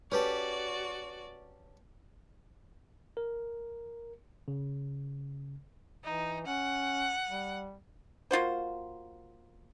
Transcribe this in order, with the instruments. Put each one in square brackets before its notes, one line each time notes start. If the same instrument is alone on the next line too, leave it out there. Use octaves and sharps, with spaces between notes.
[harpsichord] C#4 G4 A4 [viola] F#4 D5 [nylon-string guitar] B4
[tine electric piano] A#4
C#3
[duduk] E3 [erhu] D#4
[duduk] C#4 [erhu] F#5
[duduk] G3
[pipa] A#3 F4 F#4 C5